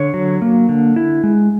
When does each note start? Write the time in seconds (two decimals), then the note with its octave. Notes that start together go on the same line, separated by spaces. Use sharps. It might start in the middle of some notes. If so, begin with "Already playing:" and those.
Already playing: D3 C#5
0.14 F#3
0.42 A#3
0.69 D3
0.96 E4
1.24 G#3